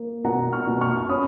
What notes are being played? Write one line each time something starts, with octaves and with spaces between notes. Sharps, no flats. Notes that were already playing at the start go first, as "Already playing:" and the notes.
Already playing: A#3
B2 F#5 A#5
C#6 F6
B2
C#6 F6
C#4 B5 D#6